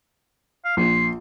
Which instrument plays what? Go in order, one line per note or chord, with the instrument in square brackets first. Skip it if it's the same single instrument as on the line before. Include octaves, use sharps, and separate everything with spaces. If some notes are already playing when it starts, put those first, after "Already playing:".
[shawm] F5
[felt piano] A#1 [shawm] C6